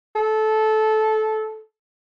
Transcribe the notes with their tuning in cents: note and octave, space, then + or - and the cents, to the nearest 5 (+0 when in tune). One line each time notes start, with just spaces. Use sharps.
A4 -15